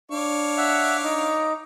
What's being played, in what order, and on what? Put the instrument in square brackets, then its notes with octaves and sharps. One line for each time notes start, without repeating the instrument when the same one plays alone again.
[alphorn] D4 [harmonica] C#5 F5 D6
[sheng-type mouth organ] E5 F#5
D#4